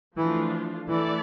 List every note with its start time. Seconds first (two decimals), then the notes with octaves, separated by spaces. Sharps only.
0.17 E3 F3 A3 D4 F4
0.88 E3 A3 E4 A4 D5